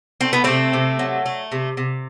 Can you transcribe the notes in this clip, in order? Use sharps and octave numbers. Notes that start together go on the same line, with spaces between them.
A3 C4
B3
C3 A3 C4
C3
F#3
A3
C3
C3